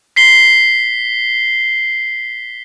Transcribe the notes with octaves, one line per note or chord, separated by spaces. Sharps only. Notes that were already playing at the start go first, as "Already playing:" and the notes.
B6 C7 G7